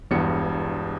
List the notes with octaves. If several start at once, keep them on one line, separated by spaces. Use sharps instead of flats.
E1 E2 G2 C#7